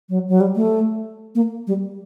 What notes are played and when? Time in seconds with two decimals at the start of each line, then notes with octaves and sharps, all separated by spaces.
0.09 F#3
0.28 F#3
0.41 G3
0.56 A3
1.35 A#3
1.67 G3